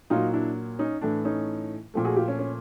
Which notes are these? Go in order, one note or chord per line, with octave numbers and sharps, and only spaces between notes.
A#2 F#3 A#3 D#4 F4
D4 E4
C#4 D#4
A2 E3 A3 D4
C#4 D#4
A#2 F3 A3
F#4 G#4
F4 G4
C#4
C#4